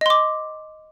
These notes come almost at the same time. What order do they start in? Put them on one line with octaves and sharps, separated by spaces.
D#5 C6 D6